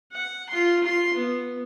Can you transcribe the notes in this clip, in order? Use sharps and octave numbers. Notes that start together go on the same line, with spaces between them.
F#5
F4 C6
F4 C6
B3